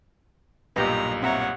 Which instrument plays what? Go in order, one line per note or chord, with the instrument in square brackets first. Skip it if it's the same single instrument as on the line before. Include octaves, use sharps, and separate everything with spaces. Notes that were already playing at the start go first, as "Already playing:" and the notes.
[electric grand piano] B1 G2 A#2 [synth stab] B3 [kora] G4 D#5 [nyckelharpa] A#5
[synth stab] C4 E5 A#5 [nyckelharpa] C#5 F#5